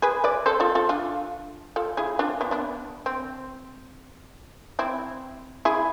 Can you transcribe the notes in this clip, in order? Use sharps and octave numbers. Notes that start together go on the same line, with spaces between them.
G#4 B4
B4 D5
A4 C5
F4 A4
F4 A4
D4 F4
F4 A4
E4 G#4
D4 F4
B3 D4
B3 D4
C4
C4 E4
E4 G#4